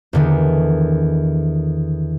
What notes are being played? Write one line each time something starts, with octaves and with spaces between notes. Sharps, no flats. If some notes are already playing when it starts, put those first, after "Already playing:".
E2 D3 D#3